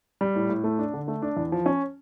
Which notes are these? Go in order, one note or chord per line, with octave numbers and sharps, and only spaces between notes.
G3
A2
A2
A3
D4
D3
A3
D4
E2
F3
C#4